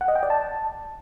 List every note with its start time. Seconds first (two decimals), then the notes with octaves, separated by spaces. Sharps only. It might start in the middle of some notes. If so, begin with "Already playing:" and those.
0.01 F#5
0.08 D#5
0.16 G5
0.23 D5
0.30 A5